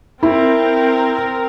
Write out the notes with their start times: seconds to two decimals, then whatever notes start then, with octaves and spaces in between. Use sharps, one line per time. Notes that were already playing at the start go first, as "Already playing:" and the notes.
0.23 C4 E4 A#4